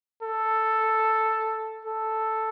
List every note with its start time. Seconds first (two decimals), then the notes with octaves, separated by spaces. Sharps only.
0.22 A4
1.85 A4